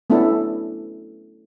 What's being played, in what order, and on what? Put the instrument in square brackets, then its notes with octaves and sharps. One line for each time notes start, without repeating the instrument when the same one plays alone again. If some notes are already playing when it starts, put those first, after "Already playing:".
[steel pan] A3 B3 C#4 D4 E4 A4